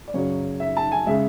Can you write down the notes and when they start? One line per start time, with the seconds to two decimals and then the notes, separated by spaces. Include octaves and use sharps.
0.08 D5
0.14 F#2 C#3 F#3 C#5
0.60 E5
0.77 A5
0.92 G#5
1.06 C#3 G#3 E5